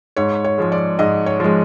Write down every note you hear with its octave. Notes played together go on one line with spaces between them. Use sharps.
G#2 C#5
C#5
F3 G#3
D5
G#2 D#5
C#5
F3 G#3